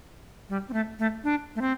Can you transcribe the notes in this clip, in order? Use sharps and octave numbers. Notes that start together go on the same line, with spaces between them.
G3
C4
A3
A3
D4
A3
C4